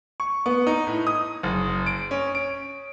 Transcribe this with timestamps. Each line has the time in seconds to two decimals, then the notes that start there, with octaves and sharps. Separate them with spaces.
0.20 C#6
0.46 B3
0.67 D#4
0.87 A2
1.07 D#6
1.43 F#1
1.86 D7
2.11 C#4
2.35 D7